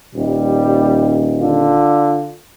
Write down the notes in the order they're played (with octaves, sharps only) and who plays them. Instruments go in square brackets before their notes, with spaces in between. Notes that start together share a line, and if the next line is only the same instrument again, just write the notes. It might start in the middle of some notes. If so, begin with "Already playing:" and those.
[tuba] D#1 [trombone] G3
[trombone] D3 [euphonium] F4